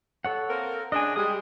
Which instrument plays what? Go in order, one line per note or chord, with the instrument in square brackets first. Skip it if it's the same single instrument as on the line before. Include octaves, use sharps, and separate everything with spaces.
[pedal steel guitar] A4 C#5 F#5
[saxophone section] A#3 C4 A#4
[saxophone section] C#3 G#3 D4 [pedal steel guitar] D#5 G#5
[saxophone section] G3 G#3 [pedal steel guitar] G4 G#5 D#6